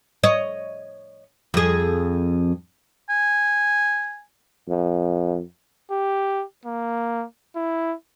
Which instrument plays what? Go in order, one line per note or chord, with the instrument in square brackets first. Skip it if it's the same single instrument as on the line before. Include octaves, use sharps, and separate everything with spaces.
[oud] C#5 D#5
F2 G#4
[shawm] G#5
[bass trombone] F2
[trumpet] G4
A#3
E4